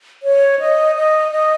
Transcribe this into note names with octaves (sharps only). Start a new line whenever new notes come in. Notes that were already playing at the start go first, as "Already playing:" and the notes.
C#5
D#5
D#5
D#5